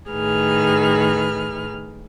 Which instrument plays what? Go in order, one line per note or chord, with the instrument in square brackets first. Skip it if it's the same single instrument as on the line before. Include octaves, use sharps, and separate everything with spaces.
[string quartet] A2 D#3 G#4 B4 F6